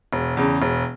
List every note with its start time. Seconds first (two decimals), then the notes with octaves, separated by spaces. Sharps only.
0.13 E1
0.37 E2 C#3
0.62 E1